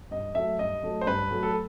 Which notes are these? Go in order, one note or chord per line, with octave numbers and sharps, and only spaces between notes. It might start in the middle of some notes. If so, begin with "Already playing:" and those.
G2 D#5
F#3 A3 E5
G2 D#5
F#3 A3
C5
G2 B4
F#3 A3
A4